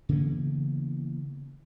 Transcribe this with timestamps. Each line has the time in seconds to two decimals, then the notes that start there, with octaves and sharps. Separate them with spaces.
0.09 C#3 E3 A#3 B3